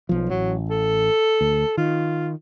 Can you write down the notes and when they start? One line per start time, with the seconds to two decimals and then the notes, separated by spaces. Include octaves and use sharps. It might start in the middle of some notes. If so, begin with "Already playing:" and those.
0.09 B1 F3
0.30 A1 F#3
0.71 A4
1.41 D2
1.77 D#3 F4